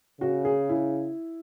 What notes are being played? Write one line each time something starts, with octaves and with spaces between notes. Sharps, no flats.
C#3 F#4
G#4
E4